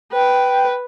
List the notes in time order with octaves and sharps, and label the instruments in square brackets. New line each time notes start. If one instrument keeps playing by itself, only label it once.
[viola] B4 [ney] G5